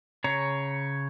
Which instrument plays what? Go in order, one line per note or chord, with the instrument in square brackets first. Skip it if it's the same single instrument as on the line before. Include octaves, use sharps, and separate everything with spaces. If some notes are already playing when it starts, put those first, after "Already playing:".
[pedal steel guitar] C#3 C#5 A#5